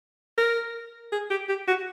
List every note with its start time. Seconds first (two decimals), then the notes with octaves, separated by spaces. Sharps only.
0.38 A#4
1.12 G#4
1.30 G4
1.48 G4
1.67 F#4